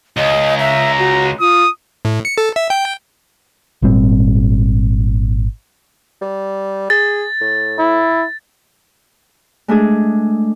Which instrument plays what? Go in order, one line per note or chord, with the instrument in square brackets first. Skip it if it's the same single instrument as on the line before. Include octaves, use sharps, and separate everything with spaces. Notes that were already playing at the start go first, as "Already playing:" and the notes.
[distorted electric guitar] C#2 [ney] D#5
[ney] E5 [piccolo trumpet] A#5
[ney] F#4
[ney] F4 [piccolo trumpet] D#6
[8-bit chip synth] A2
C#7
A4
E5
G5
[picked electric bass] G#1 A#2 G3 C4
[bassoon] G3
[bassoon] G#4 [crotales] A6
[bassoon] A2
[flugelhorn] E4
[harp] G#3 A3 D4 G#4